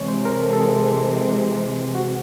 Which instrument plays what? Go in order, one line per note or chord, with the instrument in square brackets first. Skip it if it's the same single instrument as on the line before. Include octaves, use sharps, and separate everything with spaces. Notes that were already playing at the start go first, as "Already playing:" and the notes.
Already playing: [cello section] C3 E3 G#3 C4 [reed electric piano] C#5
[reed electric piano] C5
A#4
A4
A4
G#4
F#4